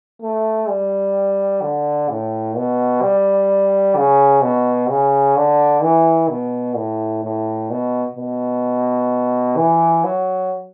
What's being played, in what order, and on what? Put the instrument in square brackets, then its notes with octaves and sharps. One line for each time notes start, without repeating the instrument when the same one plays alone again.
[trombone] A3
G3
D3
A2
B2
G3
C#3
B2
C#3
D3
E3
B2
A2
A2
B2
B2
E3
F#3